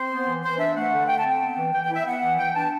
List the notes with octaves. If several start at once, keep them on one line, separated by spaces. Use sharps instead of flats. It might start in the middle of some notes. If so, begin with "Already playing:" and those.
Already playing: C4 C5
B3
E3
E3 C5
D4 E5
A3 F#5
D3
D3 G5
A5
C4
G5
B3
E3
E3 G5
G5
E4 E5
B3 F#5
E3
E3 G5
D4 A5